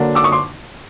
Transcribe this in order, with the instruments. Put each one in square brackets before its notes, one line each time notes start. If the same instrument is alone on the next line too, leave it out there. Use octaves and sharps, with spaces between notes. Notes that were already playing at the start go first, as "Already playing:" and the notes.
Already playing: [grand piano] D3 F#3 A#3 D4
D6 E6
C#6 D#6
C6 D6